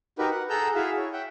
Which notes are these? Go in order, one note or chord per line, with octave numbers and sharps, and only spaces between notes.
D#4 F#4 G4 A#4 B4
F#5
G#4 A4 F#5 A#5 E6 G6
E4 F#4 G#4 E5 F5
C#5
E5 F#5 G5